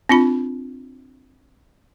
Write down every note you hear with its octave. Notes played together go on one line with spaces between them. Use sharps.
C4 D4 F4 B5